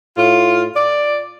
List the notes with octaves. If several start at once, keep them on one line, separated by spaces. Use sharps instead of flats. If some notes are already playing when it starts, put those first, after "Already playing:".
A2 F4
D5